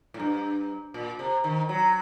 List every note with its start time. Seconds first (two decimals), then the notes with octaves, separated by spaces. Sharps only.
0.14 A2
0.20 G2
0.94 A#2
1.19 C3
1.44 D#3
1.69 F#3